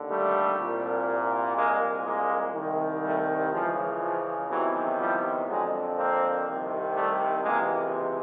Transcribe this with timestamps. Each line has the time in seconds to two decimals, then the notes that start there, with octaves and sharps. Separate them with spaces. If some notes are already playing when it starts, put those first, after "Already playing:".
Already playing: D#2 D3
0.09 G3 A3
0.58 C2 A#2
1.56 C2 A#2 G#3 A#3
2.05 G#3 A#3
2.54 C2 C3 D#3
3.03 G3 A3
3.52 C#2 C#3 E3 F3
4.01 F3
4.50 E2 C3 D#3 E3 F#3
4.99 F3 G3
5.48 F2 D3 F#3 G#3
5.97 A#3 C4
6.46 C2 C3 D#3
6.95 G3 A3
7.44 C#2 C3 E3 G#3 A#3